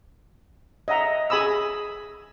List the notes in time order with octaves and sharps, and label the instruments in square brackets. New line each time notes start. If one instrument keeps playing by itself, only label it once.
[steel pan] D#5 E5 F#5 A#5
G#4 G#5 B5 D#6 E6